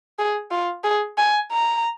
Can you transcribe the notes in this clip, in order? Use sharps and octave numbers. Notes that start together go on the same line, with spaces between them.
G#4
F4
G#4
G#5
A#5